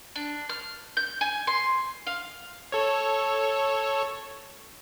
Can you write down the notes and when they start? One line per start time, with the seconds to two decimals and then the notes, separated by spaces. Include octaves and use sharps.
0.15 D4
0.49 F6
0.97 G6
1.21 G#5
1.47 C6
2.07 F5
2.72 A4 C#5